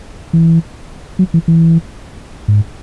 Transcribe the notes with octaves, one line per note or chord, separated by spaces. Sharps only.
E3
F#3
E3
E3
G#2